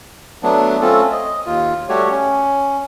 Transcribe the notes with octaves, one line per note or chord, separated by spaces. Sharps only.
F#3 A3 B3 D4
A3 C4 C#4 F4 A4
D#5
D#2 F4
G3 A3 F#4 G4 C#5
C#4